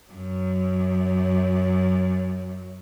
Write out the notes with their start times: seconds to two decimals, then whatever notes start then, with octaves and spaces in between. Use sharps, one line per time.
0.10 F#2 F#3